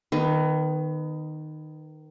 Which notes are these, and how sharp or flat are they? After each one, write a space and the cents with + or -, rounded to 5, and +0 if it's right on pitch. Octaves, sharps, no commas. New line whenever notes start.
D#3 -15 B3 +20